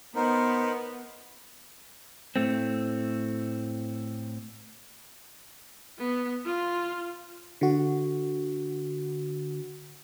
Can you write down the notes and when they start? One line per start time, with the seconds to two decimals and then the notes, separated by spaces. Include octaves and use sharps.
0.16 B3 D#4 A#4 C5
2.36 A2 A3 C4
5.98 B3
6.46 F4
7.61 D3 F#4